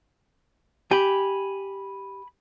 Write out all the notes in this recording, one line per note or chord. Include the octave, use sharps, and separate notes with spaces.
G4 G#5 B5